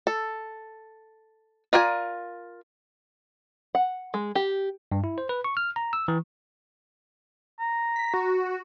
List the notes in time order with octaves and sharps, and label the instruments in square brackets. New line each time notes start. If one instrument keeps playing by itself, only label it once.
[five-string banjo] A4
F4 A#4 D5 G5 G#5
F#5
G#3
G4
[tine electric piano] G2
E4
C5
B4
C#6
F6
A#5
E6
E3
[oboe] A#5
[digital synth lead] B6
F#4